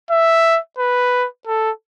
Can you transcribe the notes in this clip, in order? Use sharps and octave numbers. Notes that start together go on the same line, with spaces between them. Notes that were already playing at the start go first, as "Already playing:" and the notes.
E5
B4
A4